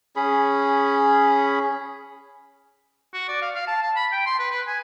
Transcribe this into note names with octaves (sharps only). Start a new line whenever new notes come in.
C#4 G#4 B5
F#4
D5
F5
F5
A5
A5
B5
G5
C6
B4
B4
G#5